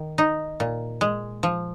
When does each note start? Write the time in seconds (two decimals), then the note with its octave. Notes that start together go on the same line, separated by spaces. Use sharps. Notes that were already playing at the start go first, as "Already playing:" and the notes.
Already playing: D#3
0.18 D#4
0.60 A#2
1.01 G#3
1.43 F3